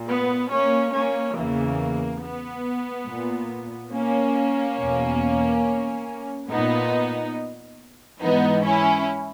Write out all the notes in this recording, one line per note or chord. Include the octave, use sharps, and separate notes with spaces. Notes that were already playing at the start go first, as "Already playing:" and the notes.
Already playing: A#2
B3
A#3 C#4
A#3 C#4
E2 C#3 E3 A#3
B3
A#2
A#3 C#4
E2 B2
A#2 B3 D#4
G#2 E3 B3 D#4
C#4 E4